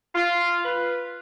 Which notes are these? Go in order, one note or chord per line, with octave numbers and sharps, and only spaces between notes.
F4
B4